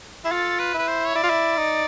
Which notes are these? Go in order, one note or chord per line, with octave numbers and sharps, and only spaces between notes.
E4 G#4
F4 A4
B4
E4 B4
C5
C#5
E4 D5
F4
E4
D#4